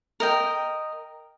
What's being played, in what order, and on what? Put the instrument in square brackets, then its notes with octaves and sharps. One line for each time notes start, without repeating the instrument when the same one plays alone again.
[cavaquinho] A#4 D#5 G5